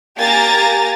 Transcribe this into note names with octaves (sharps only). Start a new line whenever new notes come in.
A#3 G4 F5 G#5 A#5 A6